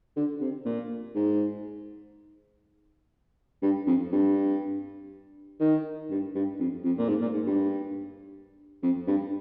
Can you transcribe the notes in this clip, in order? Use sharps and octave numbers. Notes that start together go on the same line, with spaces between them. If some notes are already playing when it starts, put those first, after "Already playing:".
D3
C3
A#2
G#2
G2
F2
G2
D#3
G2
G2
F2
F2
A#2
G#2
A#2
G#2
G2
F2
G2